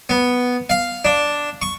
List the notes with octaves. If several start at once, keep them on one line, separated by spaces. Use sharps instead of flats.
B3
F5
D4
C#6